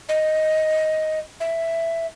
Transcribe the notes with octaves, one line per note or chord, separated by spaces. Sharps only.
D#5
E5